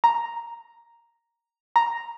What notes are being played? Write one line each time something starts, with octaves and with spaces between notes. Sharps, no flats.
A#5
A#5